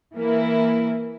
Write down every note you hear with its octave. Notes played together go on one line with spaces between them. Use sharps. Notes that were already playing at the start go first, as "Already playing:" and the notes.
E3 A#3 E4